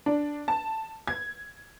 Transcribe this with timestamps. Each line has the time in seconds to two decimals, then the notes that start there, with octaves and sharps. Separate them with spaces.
0.06 D4
0.48 A5
1.07 G#6